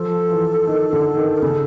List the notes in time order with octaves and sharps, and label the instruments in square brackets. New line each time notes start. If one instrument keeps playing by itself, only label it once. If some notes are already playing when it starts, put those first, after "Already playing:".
Already playing: [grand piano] F3 [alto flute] A4
[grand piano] E3
D#3
D3
D#3
[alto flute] A#4
[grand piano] C#3 [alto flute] A4